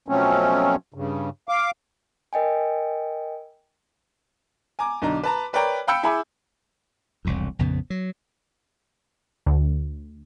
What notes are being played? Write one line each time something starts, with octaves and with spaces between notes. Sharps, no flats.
B2 F3 F#3 A3 C4 C#4
G2 C#3
F5 D6
A#4 D#5 G5 G#5
G#5 A#5 D6
B1 D3 D#4 A#5
B4 A5 A#5
A#4 B4 C#5 D5 G5 A#5
F5 G5 B5 E6 G6 C#7
E4 G#4 G#5 B5 D6
E1 C2 F2
A#1 F2 C#3 B3
F#3
D2